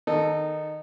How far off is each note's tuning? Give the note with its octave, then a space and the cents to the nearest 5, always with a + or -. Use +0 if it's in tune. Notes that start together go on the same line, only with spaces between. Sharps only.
D#3 +0 D#4 -20 A4 +0